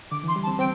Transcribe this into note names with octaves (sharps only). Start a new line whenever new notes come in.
D3 D6
E3 C6
G3
A5
C4
C4 G5